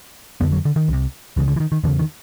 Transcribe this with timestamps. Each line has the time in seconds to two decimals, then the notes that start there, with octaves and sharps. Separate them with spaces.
0.41 F2 D3 B3
0.52 F#3
0.65 D3
0.76 D#3
0.88 C2 C3
1.37 C#2 E3
1.40 C#3
1.48 D3
1.56 E3
1.60 D#3
1.72 D#3
1.84 E2 D3
1.87 C#3
1.99 D#3